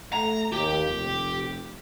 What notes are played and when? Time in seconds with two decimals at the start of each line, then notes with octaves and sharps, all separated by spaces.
0.13 A3 A#5
0.52 D#2 G4
0.89 F1